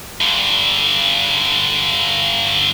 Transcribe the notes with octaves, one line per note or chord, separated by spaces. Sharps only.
G2 D3